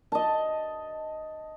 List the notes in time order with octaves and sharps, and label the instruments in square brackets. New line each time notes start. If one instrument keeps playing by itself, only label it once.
[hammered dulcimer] D#5 A5